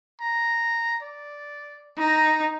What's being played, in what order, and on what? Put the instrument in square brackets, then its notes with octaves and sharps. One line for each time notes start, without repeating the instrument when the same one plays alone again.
[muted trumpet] A#5
D5
[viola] D#4 [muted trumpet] A#5